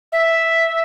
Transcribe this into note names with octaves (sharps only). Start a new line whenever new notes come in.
E5